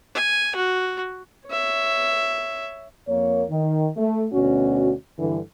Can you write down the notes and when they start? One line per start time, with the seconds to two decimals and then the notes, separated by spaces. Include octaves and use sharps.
0.15 G#5
0.56 F#4
1.46 C#5 E5
3.08 F2 A#3 C#5
3.50 D#3
3.97 A3
4.33 D2 B2 C#4 F#4
5.19 G2 D3 E3